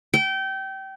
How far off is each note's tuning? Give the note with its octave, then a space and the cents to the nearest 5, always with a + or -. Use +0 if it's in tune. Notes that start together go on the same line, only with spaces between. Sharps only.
G5 -25